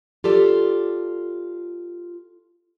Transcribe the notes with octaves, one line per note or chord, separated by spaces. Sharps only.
F4 G4 A4 D5